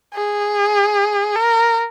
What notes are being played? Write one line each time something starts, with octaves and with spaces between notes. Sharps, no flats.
G#4
A#4